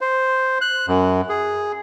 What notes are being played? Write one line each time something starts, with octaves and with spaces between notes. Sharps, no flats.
C5
F#6
F#2
G#4